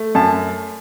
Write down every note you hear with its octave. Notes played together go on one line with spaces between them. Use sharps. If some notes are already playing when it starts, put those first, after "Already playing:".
Already playing: A3
F#2 A5